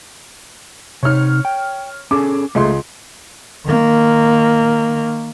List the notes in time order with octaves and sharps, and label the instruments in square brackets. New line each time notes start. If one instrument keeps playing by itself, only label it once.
[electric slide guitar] C3 D#4 [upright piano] C#5 F6
[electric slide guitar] G5
[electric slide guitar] C#4 G#4 A4 [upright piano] D6
[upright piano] C#2 G#3 C6 [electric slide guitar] A3
[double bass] D#3 A#3